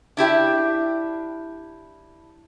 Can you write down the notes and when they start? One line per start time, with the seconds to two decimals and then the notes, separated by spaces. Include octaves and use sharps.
0.17 D4 E4 G4 E5